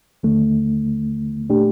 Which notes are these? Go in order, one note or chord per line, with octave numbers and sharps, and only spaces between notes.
D#2 D3 A3
A#2 A3 D4 G4